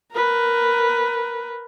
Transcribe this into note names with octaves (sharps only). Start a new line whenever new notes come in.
A#4 B4